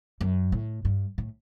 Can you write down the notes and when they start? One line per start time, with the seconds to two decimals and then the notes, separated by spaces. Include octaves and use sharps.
0.21 F#2
0.52 A2
0.85 G2
1.18 A2